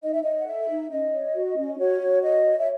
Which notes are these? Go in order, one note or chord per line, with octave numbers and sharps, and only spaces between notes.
D#4 D#5
E5
C#5 D#5
F#5
A4 E5
D#4
C#4 D#5
C#5
F#4
C#4
F#4 C#5
F#4
C#5 D#5
C#5
E5